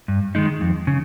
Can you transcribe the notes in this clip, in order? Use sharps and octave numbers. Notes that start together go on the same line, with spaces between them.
G2
D#3 G#3 D#4
F2
C#3